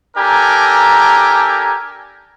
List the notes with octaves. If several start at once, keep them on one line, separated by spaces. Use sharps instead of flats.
D4 G4 A4 A#4 G#5 A#5